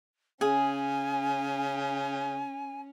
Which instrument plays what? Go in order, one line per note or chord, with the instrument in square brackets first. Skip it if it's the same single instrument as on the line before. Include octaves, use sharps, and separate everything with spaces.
[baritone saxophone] C#3 [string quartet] C#4 [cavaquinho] G#4 [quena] G#5